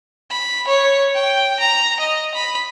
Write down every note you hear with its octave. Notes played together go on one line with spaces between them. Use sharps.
B5
C#5
G5
A#5
D#5
B5